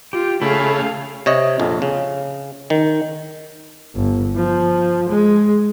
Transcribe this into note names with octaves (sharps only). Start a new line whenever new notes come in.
F4 G4
C#3 A3 G#4 F5 B5
C3 C#5 D#5
A#1 F2
C#3
D#3
G1
F3
G#3